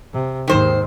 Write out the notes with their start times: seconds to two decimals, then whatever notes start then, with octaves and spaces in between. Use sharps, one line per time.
0.13 C3
0.48 D#2 G#2 D#3 C5